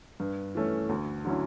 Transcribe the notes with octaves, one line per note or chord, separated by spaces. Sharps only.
G2
E3 A3 C#4
D2
D3 F#3 C#4 E4